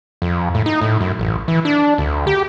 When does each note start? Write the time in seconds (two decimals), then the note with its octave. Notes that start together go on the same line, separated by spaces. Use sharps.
0.22 F2
0.54 A2
0.66 D#4
0.81 A2
1.01 F#2
1.19 A1
1.48 E3
1.65 D4
1.98 D2
2.27 G4